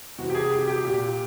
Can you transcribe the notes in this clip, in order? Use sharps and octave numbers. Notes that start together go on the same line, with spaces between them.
C3 E3 F#4
G4
G#4
G4
G4
A#2 G4